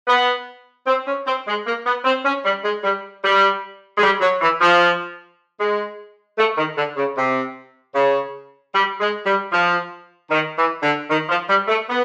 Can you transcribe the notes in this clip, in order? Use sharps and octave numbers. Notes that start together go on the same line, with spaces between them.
B3
C4
C#4
C4
G#3
A#3
B3
C4
C#4
G3
G#3
G3
G3
G#3
G3
F#3
E3
F3
G#3
A3
D#3
D3
C#3
C3
C#3
G3
G#3
G3
F3
D#3
E3
D3
D#3
F3
G3
A3
B3